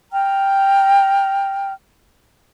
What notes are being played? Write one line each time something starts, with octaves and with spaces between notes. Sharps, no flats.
G5 A#5 F6